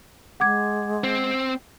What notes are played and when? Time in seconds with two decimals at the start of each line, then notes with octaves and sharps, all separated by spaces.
0.40 G#3 F#5 D6 G#6
1.04 C4